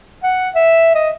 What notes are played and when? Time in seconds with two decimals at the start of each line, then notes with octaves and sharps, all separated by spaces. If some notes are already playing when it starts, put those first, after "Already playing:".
0.23 F#5
0.55 E5
0.94 D#5